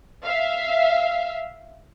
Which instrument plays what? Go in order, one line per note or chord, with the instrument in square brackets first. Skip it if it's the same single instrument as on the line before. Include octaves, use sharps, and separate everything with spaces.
[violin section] E5 F5